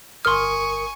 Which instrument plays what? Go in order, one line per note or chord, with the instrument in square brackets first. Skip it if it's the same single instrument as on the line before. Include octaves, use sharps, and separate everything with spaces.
[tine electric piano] G1 A#4 D#6 [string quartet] G#5 C#6 [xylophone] C6 F6